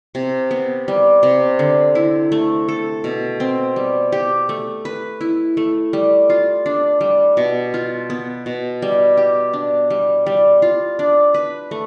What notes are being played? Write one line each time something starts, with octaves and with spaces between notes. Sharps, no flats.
C3
B3
G3
C3
D3
E4
A3
A4
B2
C4
G3
G4
A3
B4
E4
A3
G3
F4
D4
G3
B2
F4
B3
B2
G3
G4
D4
G3
G3
F4
D4
B4
A3